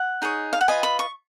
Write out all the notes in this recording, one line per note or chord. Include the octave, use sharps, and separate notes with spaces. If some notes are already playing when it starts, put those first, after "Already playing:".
Already playing: F#5
D#4 G#4 C#5
F5
F#5
F4 B4 D#5 G#5
B5
C#6